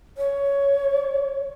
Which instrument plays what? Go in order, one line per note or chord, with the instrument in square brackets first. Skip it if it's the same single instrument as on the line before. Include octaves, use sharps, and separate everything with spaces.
[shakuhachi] C#5